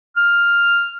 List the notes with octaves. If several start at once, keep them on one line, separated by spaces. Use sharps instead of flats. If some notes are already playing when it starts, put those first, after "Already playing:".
F6